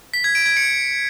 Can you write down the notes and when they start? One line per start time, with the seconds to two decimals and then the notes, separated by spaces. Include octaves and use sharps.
0.14 B6
0.24 G#6
0.35 D7
0.46 G#6
0.57 C#7